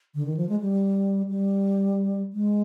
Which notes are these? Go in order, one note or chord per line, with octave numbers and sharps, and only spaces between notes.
D3
D#3
F3
G#3
G3
G3
G#3